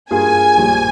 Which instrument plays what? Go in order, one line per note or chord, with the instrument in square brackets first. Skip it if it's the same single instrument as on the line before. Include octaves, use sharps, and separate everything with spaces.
[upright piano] G2 G3 A#3 F4 G#4 [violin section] G#5
[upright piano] A#1 A#2 G3